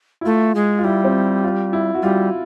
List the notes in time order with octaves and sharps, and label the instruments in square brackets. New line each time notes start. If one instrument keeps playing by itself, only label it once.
[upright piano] E4
[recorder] A3 [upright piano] F4
[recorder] G#3
[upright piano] F4
[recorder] G3 [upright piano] E4
[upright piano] C4
F4
E4
F#4
[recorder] G3 [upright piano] F4